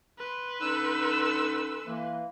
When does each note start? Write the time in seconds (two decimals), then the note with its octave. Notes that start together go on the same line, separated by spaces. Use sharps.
0.18 B4 C6
0.61 D3 C#4 D#4 A4 E6
1.87 E3 A#3